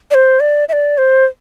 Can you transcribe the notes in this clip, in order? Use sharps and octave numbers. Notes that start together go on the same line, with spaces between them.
D5
C5
D5
E5
D5
C5